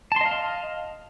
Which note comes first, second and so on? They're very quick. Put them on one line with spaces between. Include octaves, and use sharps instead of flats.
A5 C6 D#5 F5